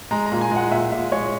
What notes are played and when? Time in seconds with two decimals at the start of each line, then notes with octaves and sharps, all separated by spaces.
0.11 G#3 A#5
0.26 A#5
0.32 A#2
0.41 G#5
0.51 G#3 F#5
0.71 A#2 E5
0.92 A#2 E5
1.12 G#3 C#5